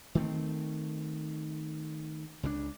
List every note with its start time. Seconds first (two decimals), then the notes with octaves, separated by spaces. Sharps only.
0.15 D#3 A3 C4
2.43 C#2 C#3 F3 D4